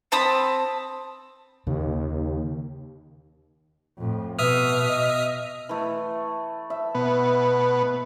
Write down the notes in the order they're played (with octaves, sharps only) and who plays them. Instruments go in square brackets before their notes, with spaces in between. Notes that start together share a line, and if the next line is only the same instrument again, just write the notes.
[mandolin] C4 A5 B5 D#6
[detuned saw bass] D#2 [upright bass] C#3
[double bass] F2 A2
[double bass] B2 [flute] B4 [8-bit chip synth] E5 D#6 F6
[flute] D#5
[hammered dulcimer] E3 A3
E5
[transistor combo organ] B2 B3